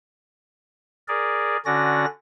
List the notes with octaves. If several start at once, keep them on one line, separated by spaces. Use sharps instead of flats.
G#4 A#4 D5
D3 C#4 F#4 D5 A#6